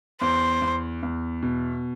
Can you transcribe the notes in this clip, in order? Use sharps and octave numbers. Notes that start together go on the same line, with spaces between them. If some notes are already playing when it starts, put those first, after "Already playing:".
E2 C5
E2
E2
B2